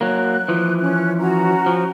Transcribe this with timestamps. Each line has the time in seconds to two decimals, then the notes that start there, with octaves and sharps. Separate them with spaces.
0.01 F#3 A#3 F#6
0.48 E3 F3
0.80 C#4 F#6
1.19 C#4 F#4 A#5
1.66 F3